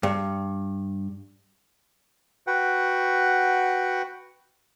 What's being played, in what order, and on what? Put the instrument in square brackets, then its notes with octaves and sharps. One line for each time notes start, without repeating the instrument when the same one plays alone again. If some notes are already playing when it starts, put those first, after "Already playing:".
[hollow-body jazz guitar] G2
[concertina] F#4 B4 F#5 G5